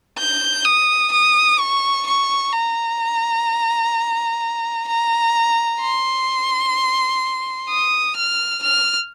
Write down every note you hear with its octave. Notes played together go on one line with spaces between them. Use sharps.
G6
D#6
D#6
C#6
C#6
A#5
A#5
C6
D#6
F6
F6